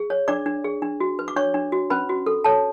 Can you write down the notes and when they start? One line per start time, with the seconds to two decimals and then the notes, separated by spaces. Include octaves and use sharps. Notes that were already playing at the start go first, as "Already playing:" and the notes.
Already playing: G#4
0.10 C#5
0.28 D4 D5 D6
0.46 D4
0.65 G#4
0.82 D4
1.00 F#4
1.19 B4
1.28 D6
1.36 D4 C#5 C#6
1.54 D4
1.72 F#4
1.90 C#4 B4 B5
2.09 F#4
2.26 A4
2.44 A4 C#5 A5